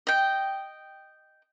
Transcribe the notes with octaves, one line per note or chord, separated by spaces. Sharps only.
D#5 G5